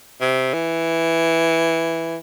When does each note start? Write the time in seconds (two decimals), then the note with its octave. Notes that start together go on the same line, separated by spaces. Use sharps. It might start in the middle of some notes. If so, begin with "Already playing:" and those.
0.21 C3
0.53 E3